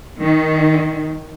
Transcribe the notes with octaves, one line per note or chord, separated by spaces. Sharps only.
D#3